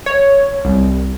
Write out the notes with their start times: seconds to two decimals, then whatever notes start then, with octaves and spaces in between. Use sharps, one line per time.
0.06 C#5
0.65 C2